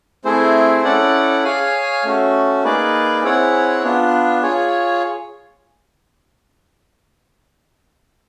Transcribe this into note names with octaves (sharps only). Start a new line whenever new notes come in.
A3 C4 E4 G#4 C5
C#4 E4 A4 D5 F#5
G#4 C#5 F5 G#5
A3 C#4 F#4
A#3 D#4 G#4 B4 D5
C4 E4 G#4 C#5 F#5
B3 D4 F4
F4 G#4 C#5